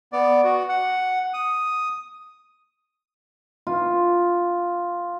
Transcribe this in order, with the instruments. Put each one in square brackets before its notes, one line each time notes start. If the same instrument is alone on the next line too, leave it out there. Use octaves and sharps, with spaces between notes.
[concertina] B3 D5
F#4
F#5
D#6
[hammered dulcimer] F4